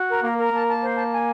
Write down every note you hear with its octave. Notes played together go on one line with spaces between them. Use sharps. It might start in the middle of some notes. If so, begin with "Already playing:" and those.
Already playing: F#4
A#4
A#3 A#4
A#4
A#3 A5
A5
C5
A5
G#5